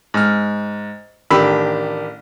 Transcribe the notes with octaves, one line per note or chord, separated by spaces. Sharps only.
G#2 F6
A1 D#3 D4 G4 B5 E6